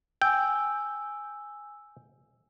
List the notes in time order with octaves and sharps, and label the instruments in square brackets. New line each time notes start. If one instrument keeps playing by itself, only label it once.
[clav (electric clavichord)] G5 [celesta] G#5 E6